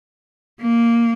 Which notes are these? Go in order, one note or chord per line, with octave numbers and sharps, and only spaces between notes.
A#3